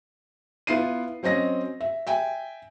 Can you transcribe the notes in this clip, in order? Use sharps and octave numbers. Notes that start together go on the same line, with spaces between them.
B3 E4 F4 C7 D#7
F#3 C4 C#4 D#5 A#6
E5
E5 G5 G#5